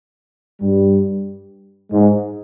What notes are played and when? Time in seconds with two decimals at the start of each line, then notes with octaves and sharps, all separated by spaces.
0.61 G2 G3
1.91 G#2 G#3